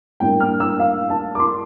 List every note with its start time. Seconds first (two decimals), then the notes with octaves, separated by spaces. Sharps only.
0.20 A2 G3 A#3 D4 G5
0.40 F6
0.60 E6
0.80 F5
1.10 A5
1.35 D6
1.40 C6